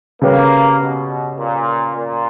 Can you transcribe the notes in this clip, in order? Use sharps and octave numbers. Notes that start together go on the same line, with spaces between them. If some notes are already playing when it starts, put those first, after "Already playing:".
C#3 G3 A#3 C#4 G4 B4
B2
A#2
A#2